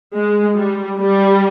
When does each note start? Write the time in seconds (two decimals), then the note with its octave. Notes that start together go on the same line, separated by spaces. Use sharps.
0.14 G#3
0.56 G3
0.98 G3